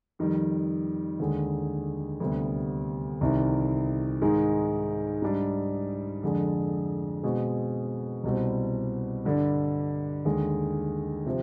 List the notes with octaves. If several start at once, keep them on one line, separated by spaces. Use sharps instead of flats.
F2 D#3 G3
D#2 D3 G#3
D2 C3 G3 B3
C2 C3 D#3
G#2 D#3 G#3
G#2 G3 D4
F2 D3 G#3 D4
B2 G#3 C4
C2 B2 G3 C4
G2 D3 G3 D4
D#2 D3 G#3
C3 F3 C4